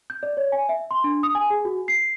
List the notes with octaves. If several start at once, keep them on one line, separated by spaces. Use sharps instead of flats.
G6
D5
C#5
G#5
E5
C6
D4
D#6
G#5
G#4
F#4
C7